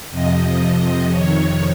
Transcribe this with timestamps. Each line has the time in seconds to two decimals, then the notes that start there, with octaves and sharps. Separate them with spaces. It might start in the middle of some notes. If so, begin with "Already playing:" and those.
0.10 F2 C3 F3 D#5
0.59 D#5
1.09 F2 C3 D#3 C#5